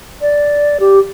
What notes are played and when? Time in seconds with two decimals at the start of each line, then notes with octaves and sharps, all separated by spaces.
0.21 D5
0.80 G4